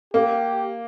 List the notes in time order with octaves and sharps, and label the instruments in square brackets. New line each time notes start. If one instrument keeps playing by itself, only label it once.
[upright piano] A#3 [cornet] G4